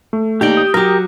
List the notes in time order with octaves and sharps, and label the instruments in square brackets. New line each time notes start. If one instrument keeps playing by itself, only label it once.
[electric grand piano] A3
[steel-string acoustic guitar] D#2 D#4 D5 [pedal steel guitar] G4 G5
[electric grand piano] D#6
[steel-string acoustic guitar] F#3 F#4 [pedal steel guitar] G4 A#4